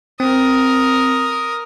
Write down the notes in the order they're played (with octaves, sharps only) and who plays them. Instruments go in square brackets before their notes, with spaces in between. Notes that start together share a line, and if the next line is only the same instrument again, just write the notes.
[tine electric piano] C4 [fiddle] A#4 D#6